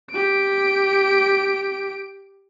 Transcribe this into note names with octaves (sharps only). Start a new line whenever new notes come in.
G4 D7